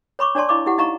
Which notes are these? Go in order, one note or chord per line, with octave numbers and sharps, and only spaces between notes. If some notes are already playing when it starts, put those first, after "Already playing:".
C#5 B5 C#6 D6
D4 C#5 D5 A5 C6
E4 D#5 F5 B5 C#6 D6
E4 G4 F#5
D#4 D#5 F5 A#5 C#6